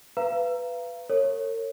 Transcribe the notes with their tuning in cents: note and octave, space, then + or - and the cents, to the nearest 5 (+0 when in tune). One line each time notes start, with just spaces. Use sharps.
B4 +10 F5 -35 A#5 +0
A#4 -45 C#5 -20